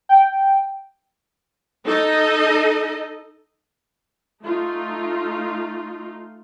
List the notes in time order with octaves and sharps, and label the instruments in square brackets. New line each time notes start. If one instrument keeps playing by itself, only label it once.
[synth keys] G5
[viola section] D#4 A4 D#5
A3 D#4 F4